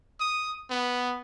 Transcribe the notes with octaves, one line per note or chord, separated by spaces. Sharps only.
D#6
B3